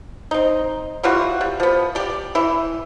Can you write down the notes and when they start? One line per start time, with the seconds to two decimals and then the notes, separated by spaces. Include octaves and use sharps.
0.31 C4 D#4
1.03 E3 G3 F4 F#4
1.41 G3
1.60 F3 B3
1.95 G4 D5
2.35 E3 E4